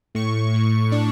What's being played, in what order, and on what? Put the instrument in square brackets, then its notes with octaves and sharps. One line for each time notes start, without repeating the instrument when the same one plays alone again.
[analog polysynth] A2 C#6
A2
D4